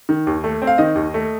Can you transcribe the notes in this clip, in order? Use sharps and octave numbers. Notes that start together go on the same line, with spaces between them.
D#3
D#2
A3
C4
F5
D#3 D#5
D#2
A3